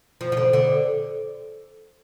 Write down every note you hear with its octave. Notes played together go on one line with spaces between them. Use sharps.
F3
F3
D3
D3